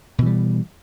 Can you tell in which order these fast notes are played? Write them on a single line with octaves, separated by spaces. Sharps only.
B2 E3 G3